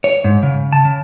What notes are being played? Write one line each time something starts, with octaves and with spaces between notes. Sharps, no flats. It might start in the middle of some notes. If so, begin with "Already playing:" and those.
C#5
G#2
C#3
A5
C#3